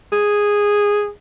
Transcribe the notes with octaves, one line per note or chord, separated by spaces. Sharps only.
G#4